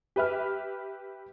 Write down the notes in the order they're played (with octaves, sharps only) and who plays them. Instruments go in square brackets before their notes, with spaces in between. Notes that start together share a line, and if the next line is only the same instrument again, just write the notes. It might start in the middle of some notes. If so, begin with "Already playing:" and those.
[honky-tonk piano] G4 B4 E5 F6